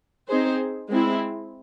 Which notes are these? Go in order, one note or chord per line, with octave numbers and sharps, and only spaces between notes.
C4 D#4 G#4 C5
G#3 C4 E4